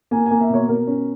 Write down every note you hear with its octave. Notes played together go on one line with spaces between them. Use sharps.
A#3 G#5
A#3 G#5
E5
B2 C#5
B2 A#4
C#4